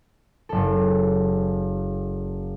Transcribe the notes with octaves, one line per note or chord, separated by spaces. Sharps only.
F#1 A4